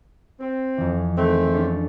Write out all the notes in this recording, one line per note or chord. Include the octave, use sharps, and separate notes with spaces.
C4
F2 E3
D#3 G#3 A3 C4
C#4 D4 A4